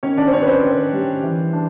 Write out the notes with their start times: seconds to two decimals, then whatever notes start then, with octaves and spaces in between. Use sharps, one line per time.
0.03 D#3 C#4 C#5
0.17 D4 D5
0.27 C5
0.32 C4 C#4 C#5
0.42 B4
0.47 C5
0.63 D#3
0.93 G3
1.23 E3
1.53 D4